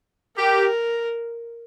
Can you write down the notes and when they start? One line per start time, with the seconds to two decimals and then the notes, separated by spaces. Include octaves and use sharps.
0.37 G4 A#4